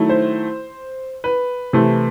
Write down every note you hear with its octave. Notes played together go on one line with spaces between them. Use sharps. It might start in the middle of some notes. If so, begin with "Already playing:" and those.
Already playing: D#3 F#3 A3 E4
C5
B4
C3 E3 A3